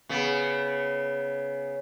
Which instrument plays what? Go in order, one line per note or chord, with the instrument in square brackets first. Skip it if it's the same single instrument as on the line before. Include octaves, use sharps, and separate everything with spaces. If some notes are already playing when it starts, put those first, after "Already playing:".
[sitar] C#3 B3